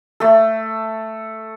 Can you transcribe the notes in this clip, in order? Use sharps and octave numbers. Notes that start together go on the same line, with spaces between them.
A3 A4